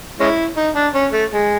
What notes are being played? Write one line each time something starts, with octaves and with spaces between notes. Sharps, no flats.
G#3 C#4 E4
D#4
D4
C#4
A3
G#3